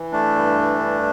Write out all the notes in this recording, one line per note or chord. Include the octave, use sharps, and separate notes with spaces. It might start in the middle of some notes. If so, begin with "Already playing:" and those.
Already playing: E3
A3 D4
G2
G2